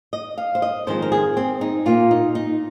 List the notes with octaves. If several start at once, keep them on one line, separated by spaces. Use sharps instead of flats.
D#5
F5
C5
D#5
F2 D#3 G#3 C4 C5
A#4
G#4
C4
D#4
A#2 A#3 F4
D#4
D#4